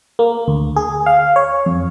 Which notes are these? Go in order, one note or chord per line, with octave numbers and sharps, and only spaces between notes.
A#3
D2
G#4
F5
C#5
F2